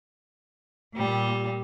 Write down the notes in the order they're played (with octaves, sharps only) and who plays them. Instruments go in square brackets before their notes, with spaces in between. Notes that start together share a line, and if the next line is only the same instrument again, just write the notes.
[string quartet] A#2 G3